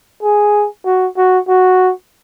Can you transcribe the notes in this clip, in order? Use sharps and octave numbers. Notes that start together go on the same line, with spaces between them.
G#4
F#4
F#4
F#4